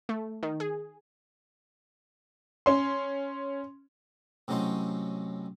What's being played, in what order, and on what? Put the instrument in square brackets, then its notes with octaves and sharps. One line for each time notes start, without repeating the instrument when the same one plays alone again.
[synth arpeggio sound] A3
D#3
G#4
[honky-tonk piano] C#4 C6
[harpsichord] A2 C3 F#3 C#4 D#4 C6